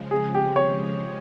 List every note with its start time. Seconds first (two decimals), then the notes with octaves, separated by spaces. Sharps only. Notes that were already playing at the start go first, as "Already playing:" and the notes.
Already playing: C#3 F3 G#3
0.11 G#4
0.34 G4
0.56 C#5